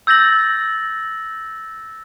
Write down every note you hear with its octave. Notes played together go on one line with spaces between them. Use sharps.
E6 G6 A6 A#6 F#7